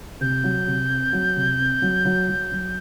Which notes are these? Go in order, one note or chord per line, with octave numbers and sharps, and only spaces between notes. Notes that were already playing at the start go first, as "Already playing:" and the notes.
C3 G6
F#3
C3
C4
F#3
C3
C4
F#3
F#3
F#3
F#3